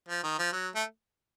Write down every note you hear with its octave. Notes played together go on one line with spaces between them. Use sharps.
F3
D#3
F3
F#3
A3